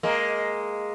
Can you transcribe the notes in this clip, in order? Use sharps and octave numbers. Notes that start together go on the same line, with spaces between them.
G#3 A#3